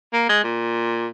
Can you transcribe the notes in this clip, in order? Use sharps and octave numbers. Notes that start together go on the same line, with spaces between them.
A#3
G#3
A#2